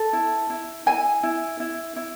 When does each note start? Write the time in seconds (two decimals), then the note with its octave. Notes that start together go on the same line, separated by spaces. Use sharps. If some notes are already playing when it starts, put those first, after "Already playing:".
Already playing: A4
0.13 E4
0.50 E4
0.86 E4 G#5
1.23 E4
1.60 E4
1.96 E4